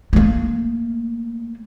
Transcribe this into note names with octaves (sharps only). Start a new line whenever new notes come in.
A3 A#3